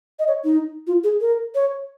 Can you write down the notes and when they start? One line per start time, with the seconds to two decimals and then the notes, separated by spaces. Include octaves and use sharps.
0.19 D#5
0.28 C#5
0.44 D#4
0.87 F4
1.04 G#4
1.21 A#4
1.55 C#5